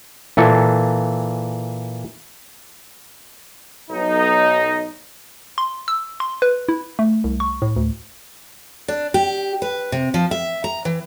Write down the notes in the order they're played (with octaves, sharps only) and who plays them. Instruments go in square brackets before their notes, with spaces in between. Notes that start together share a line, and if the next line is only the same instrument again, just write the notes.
[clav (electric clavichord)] A#2 E3 A4
[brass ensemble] B1 D#4
[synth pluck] C6
E6
C6
B4
E4
A3
C2
C#6
A2
D2
[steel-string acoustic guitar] D4
G4
B4
C3
F3
E5
A#5
E3